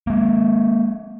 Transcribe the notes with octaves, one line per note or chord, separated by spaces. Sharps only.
G#3 A#3